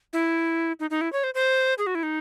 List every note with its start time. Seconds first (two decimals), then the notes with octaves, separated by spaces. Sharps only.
0.13 E4
0.80 D#4
0.90 D#4
1.01 E4
1.12 C#5
1.23 C5
1.34 C5
1.78 G#4
1.86 F#4
1.95 E4
2.03 D#4